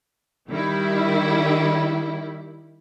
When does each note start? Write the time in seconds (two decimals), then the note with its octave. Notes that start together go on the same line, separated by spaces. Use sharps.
0.50 D#3 G3 E4